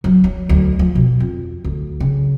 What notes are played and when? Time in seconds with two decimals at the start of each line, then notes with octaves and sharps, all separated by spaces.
0.04 F#3
0.24 F#3
0.49 D2
0.79 F3
0.95 B2
1.20 F2
1.64 D2
2.00 C#3